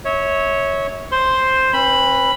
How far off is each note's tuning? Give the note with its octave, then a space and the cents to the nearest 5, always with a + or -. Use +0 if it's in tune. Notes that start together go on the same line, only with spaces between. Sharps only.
C#5 +0 E5 -30
C5 +0 C6 +0
C4 +40 B4 +0 B5 +0